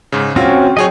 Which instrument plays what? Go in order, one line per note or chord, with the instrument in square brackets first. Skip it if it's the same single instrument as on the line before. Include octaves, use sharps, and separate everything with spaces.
[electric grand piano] G#2 C#3
[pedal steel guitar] C4 C#4 F#4 [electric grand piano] F4
[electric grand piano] F#3 G#4 C#5 [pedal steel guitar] D#5 G5